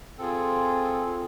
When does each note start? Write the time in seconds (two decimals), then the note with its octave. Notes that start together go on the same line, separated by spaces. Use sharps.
0.18 C4 F4 G#4 A4
1.04 C4 F4 G#4